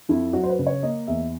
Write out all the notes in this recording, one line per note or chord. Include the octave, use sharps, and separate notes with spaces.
F2 E4
F#3 F#4
C5
B4
C#3
C#5
A#3 D#5
E2 E5